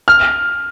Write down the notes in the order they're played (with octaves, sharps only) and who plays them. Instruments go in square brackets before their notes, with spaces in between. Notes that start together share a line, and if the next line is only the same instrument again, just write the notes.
[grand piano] F6